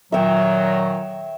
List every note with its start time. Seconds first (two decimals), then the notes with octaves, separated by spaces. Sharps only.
0.12 A#2 D#3 F#3 E5 G5